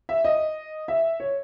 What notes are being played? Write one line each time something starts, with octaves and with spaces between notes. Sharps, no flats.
E5
D#5
E5
C#5